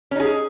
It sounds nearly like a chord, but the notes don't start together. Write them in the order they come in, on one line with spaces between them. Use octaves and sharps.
C#4 D#4 G#4